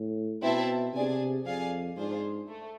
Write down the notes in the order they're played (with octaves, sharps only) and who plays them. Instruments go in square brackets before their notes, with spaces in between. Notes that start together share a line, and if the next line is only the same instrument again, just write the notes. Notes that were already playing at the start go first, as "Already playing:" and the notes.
Already playing: [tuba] A2
[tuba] B2 [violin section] C4 E4 B4 E5 A5
[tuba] C3 [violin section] D4 G#4 D5 G#5
[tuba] F2 [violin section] G#4 D5 F5 G#5
[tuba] G#2 [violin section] D4 F4 G#4 C5
[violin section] A3